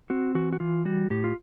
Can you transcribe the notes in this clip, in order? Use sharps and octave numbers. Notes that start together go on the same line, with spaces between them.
C4 F#4
E3 F#4
F#4
E3 F4
G3 F#4
A2 G4
F4